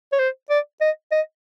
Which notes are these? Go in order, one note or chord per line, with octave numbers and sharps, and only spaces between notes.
C#5
C5
D5
D#5
D#5